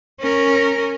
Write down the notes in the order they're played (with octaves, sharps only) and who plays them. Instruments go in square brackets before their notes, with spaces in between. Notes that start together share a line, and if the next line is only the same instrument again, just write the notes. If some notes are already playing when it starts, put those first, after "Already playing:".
[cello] C#4 A#4